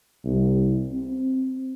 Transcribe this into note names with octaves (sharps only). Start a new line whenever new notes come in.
C2
C4